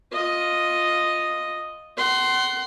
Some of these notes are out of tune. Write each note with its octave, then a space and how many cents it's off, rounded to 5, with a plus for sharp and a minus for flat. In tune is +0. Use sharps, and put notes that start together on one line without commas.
F4 +10 D#5 +0
F#5 +35 C6 +0